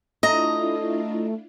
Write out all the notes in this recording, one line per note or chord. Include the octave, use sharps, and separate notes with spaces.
A3 D4 E4 F4 D#5 A#5